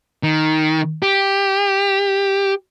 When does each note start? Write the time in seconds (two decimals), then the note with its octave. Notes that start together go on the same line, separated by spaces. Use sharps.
0.23 D#3
1.03 G4